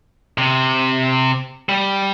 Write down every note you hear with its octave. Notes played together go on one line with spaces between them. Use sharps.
C3
G3